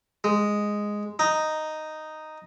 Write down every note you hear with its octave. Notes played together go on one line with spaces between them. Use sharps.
G#3
D#4